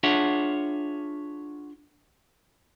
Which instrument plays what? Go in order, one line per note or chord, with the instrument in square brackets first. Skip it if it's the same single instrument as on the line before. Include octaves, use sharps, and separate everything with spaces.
[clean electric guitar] D4 F4 G#4 C#5 E5 F#5